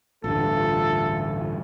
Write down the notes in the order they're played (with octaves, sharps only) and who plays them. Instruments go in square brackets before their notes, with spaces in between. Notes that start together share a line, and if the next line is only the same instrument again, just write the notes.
[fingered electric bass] A1 D2 G2 [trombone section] A3 F4 [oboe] A4